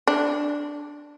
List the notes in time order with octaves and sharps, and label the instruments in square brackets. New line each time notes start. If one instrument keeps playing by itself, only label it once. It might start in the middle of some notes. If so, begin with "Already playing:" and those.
[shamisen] D4